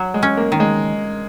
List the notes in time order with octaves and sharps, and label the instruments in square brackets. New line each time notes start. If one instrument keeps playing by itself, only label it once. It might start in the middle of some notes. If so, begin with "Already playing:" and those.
Already playing: [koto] F#3
[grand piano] G#3
[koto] C#4
[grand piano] A#3
[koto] D#3
[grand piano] G#3